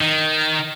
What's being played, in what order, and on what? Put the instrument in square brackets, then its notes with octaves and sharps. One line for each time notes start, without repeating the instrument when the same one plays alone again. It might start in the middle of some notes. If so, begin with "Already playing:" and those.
[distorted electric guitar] D#3